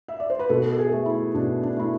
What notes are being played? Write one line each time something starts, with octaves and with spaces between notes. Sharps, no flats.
E5
D5
C5
B4
B2 A4
A4
G#4
A3
E4
B2 D4
D4
A3 E4